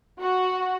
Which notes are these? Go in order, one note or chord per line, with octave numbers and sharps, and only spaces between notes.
F#4